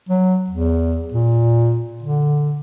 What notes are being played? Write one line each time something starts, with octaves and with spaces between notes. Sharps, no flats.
F#3
E2
A#2
D3